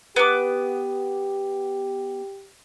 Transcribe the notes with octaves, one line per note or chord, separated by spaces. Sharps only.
B3 G4 D6